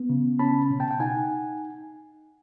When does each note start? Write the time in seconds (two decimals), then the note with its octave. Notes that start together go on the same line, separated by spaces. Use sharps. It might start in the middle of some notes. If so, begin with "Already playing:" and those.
Already playing: B3
0.09 C#3
0.39 C#4 A5 B5
0.70 B2
0.80 G5 A5
0.91 G5
1.00 D#4 F#5 G#5